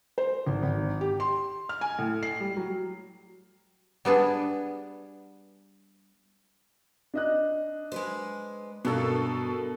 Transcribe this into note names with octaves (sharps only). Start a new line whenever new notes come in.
C5
G#1
G#1
G4
C6
F6
G#5
A2
C7
G3
F#3
G3 B3 D4 G#4
D4 D#5 F#6
G#3 B4 C5
G2 B2 A4 A#4